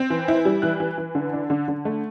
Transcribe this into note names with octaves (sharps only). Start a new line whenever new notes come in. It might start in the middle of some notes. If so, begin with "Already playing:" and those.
Already playing: C4
E3
E4
G3
E3 F#6
E3
E3
D3
D4
D3
D3
A3